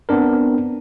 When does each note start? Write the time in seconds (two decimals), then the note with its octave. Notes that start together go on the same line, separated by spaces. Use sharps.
0.09 B3 C4 D4 A#4